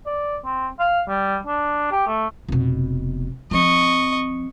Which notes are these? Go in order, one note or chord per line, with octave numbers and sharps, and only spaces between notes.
D5
C4
F5
G3
D4
G4
A3
F1 B2
F3 C4 D#5 C#6